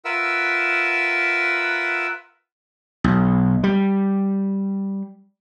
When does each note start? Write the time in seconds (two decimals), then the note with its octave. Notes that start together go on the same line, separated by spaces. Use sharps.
0.05 F4 A#4 B4 E5 F#5 E6
3.04 B1
3.64 G3